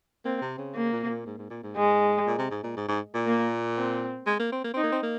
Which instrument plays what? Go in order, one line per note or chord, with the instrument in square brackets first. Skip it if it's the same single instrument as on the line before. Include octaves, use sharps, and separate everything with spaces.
[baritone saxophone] A#3 [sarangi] C4
[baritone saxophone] C3
C#3
[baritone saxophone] C#3 [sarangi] A#3
[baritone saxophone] A#2
C3
A#2
G#2
G#2
A#2
G#2
[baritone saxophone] G#2 [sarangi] G#3
[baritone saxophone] A#2
C3
G#2
A#2
G#2
G#2
A#2
[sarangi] A#3
C4
[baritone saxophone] G#3
A#3
C4
A#3
[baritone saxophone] C4 [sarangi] D#4
[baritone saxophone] A#3
C4
A#3